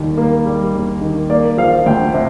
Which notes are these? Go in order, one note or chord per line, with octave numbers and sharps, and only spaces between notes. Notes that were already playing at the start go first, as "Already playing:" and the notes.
Already playing: D#2 D#3 G3
A#3 A#4
G3
D#2
D#3
A#3 D5
F3 F5
D2 G5
C3